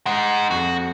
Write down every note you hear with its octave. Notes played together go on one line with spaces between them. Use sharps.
G#3 D#4 F#5
F2 F#4